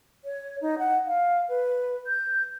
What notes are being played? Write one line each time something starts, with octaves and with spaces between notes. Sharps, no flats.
C#5
D#4
F#5
F5
B4
G6